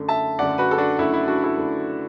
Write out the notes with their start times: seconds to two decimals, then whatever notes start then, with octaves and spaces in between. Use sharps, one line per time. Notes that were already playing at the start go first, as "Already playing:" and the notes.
Already playing: F#2 D3 A3
0.09 E5 A5
0.39 F#2 D3 A3 D5 F#5
0.58 F#4 B4
0.71 A4
0.78 D4 F#4
0.98 F#2 D3 A3 E4
1.13 E4
1.28 D4 F#4
1.43 E4 A4
1.58 F#2 D3 A3